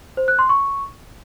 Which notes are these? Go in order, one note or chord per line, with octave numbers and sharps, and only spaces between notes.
C5
F#6
C6
C#6